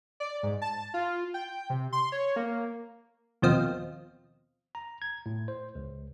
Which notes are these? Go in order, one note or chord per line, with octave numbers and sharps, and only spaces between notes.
D5
G#2
A5
F4
G5
C3
C6
C#5
A#3
D#2 B2 F3 C4 D#5 F5
A#5
G#6
A2
C5
C#2